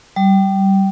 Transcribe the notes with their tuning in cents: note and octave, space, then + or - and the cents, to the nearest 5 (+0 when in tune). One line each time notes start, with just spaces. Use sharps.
G3 -15